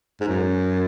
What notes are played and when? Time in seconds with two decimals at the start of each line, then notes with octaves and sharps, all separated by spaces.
0.21 G#2
0.28 F#2